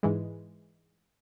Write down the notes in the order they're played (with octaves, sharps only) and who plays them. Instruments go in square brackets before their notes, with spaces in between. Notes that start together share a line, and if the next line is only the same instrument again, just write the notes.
[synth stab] G#2 E3 G#3